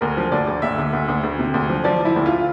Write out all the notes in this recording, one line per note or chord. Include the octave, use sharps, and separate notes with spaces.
D2 A#4
F3
D2 D5
D2
D2 E5
D2
D2
D2
D2
C3
D2
F3
F3 D5
F3 E4
D2
F4